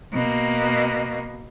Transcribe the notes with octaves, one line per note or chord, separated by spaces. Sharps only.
B2 A#3